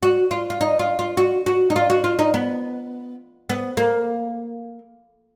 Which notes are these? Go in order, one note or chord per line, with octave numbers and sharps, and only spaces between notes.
F#4
F4
F4
D#4
F4
F4
F#4
F#4
D#4
F4
F#4
F4
D#4
B3
B3
A#3